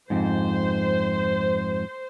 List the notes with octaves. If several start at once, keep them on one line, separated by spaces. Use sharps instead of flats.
F2 G#2 C5